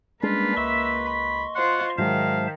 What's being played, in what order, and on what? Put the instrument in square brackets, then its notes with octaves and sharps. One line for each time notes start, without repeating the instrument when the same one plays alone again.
[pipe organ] G3 C#4 D4 [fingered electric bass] G#3 [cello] A#3 B4 [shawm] F4
[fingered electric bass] C#2 [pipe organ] D#5 C6 C#6 [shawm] E5
[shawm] B5
[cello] F4 C5 [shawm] F#5
[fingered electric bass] G#2 F#3 G#3 [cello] D#3 [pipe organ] C5 E5 A5 [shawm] F5